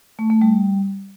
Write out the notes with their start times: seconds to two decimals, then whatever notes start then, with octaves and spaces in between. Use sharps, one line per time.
0.19 A3
0.30 A3
0.42 G3